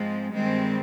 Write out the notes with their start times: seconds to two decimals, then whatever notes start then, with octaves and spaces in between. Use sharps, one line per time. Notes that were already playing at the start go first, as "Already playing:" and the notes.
Already playing: G#2 F3 G#3 C4
0.34 G2 D#3 G3 G#3 C4